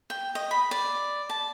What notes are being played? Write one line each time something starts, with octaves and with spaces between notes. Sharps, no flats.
G5
D#5
B5
D5
A5